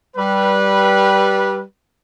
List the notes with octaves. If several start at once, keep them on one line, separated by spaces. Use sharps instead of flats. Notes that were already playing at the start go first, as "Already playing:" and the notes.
G3 B4